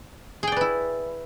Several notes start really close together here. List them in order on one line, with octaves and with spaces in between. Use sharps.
G#4 G5 D5 B4 E4